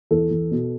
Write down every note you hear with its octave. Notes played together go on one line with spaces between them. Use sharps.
E2 A4
E2
B2